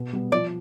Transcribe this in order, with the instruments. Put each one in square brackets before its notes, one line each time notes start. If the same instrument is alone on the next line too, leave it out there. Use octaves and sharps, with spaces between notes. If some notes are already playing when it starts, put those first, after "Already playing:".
Already playing: [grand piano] B2
G3 B3
[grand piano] F3 [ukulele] D5